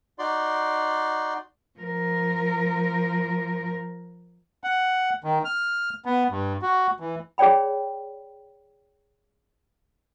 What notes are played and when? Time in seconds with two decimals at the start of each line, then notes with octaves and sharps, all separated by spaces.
0.19 D#4 F#4 D5 C6
1.79 F3 A#4
4.64 F#5
5.24 D#3
5.45 F6
6.05 B3
6.30 G2
6.62 F#4
7.00 E3
7.38 G#4 C#5 D5 G5 B5